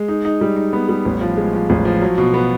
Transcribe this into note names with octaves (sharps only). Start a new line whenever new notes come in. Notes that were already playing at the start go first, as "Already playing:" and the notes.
Already playing: G#3
D#4
D#4
G3
D#4
B3
G3
A1
F3
G#3
F3
A1
F3
F#3
B2
B3